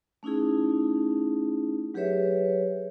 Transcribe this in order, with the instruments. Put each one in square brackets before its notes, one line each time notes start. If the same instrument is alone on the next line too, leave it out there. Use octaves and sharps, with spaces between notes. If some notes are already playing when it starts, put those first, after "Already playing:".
[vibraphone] A3 C#4 D#4 E4 G#4
F#3 G4 G#4 B4 C#5 E5